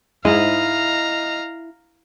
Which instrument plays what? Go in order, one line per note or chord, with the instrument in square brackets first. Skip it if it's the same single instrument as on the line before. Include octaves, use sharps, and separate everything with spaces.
[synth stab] G#2 [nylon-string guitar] E4 [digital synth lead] D#5 [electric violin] F5 A#5